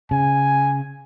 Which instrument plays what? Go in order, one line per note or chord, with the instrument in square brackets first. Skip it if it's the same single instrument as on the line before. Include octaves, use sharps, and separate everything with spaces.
[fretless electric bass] C#3 [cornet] G#5